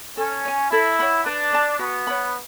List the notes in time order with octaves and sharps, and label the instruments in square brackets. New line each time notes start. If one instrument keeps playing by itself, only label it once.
[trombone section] C#4 [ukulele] A4
[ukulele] C#5 G#5
[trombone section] E4 [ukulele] A4
[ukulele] C#5 F#5 B5
[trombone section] D4 [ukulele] B4
[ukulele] D5 A5
[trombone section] B3 [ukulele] F#4
[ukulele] C#5 F#5 B5